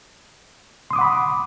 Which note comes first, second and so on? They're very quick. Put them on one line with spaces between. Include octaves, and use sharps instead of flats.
C6 D#6 D6 F#5 B5